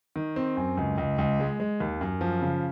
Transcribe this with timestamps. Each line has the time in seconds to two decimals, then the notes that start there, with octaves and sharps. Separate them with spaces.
0.16 D#3
0.36 C4
0.57 F#2
0.77 C#2
0.98 C#2
1.18 C#2
1.40 G#3
1.60 G#3
1.80 D#2
2.01 F#2
2.21 F3
2.42 C#3